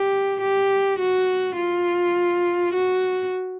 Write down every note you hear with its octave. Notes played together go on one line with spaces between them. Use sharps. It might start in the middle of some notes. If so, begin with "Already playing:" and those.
Already playing: G4
G4
F#4
F4
F#4